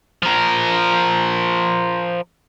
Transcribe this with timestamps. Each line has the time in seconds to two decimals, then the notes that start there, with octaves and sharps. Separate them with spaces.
0.23 F3 A#4